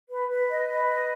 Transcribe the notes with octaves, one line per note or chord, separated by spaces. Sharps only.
B4
B4
D#5
B4
D#5